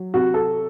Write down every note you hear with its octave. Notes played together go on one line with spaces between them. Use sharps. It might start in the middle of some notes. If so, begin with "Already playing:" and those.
Already playing: F#3
C3 F#4
A4